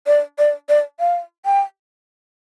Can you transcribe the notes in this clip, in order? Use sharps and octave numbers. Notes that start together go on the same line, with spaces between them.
D5
D5
D5
F5
G5